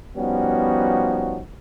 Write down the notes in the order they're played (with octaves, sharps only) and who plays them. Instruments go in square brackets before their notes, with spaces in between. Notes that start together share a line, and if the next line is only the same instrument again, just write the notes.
[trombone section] F3 G3 B3 C#4 D#4 F#4